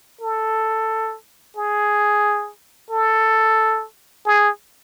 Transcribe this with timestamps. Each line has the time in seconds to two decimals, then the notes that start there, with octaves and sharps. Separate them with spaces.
0.21 A4
1.57 G#4
2.91 A4
4.26 G#4